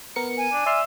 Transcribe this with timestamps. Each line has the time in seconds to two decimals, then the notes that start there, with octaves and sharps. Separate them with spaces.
0.16 B3 A#4 C#7
0.37 G#5
0.52 D4
0.66 D5 E5 C6 F6